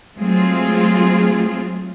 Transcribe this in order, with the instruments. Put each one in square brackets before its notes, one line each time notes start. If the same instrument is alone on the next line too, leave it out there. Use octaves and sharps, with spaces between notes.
[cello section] F#3 G#3 A3 C4 F4 G#4